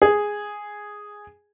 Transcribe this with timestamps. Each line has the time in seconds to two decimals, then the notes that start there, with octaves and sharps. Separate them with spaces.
0.02 G#4